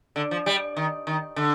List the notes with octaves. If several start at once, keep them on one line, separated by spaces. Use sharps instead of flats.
D3
F3
G3
D#3
D#3
D3